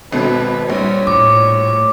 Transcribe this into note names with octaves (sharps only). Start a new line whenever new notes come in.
G#1 B2 A4 B4
A#1 G3 C#5
A2 D6